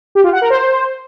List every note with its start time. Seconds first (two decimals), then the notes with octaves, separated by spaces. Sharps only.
0.15 G4
0.24 F4
0.33 F#5
0.41 A#4
0.50 C5